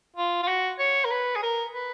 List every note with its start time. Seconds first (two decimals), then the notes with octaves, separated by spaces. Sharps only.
0.16 F4
0.43 F4
0.48 F#4
0.79 C#5
1.05 A#4
1.11 B4
1.36 G#4
1.43 A#4
1.75 B4